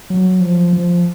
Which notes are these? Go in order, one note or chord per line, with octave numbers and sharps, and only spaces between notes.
F#3
F3
F3